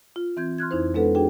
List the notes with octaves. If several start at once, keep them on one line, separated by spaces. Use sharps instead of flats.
F4
E3 C4 G6 G#6
C6 F6 F#6 G#6
F2 D#4 E4 C5
G#3 B3 D4 A4 B4 F#5
D4 F#4 G#4 G5